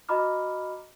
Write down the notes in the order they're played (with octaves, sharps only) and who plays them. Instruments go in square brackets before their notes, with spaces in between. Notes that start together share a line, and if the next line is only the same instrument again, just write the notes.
[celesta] F#4 D#5 A#5 B5 D6 F6